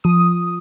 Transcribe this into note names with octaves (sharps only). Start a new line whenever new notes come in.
F3 D#6